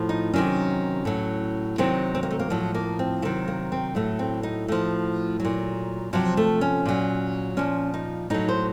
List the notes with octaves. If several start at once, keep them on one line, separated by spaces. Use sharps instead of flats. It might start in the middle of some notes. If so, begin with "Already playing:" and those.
Already playing: A2 F3
D#4
C3 D#3 F#3 C#4
A2 F#3
C3 D#3 F#3 C4
C4
A#3
A3
A#3
A2 F3 F#3
A#3
C4
C3 D#3 F#3 A3
A#3
C4
A2 F#3 A3
C4
D#4
A2 F3 A3
A#2 F#3
C3 F3 F#3
A3
C#4
A#2 F#3
A#2 F3 C#4
D#4
A2 F#3 D#4
C5